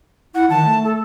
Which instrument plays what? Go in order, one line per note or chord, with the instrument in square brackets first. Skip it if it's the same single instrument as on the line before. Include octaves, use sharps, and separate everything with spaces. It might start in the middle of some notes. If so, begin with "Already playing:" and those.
[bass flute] E4 [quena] F#5
[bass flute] D#3 [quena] A5
[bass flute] A3
[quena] A4